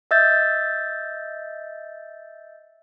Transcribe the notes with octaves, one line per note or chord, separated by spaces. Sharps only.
D#5 E5 E6 G6 A6